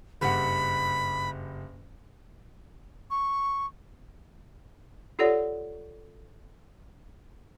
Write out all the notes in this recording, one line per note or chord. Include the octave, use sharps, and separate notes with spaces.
F#1 G2 F#5 B5
C#6
F4 G4 A4 C#5 D5 F#5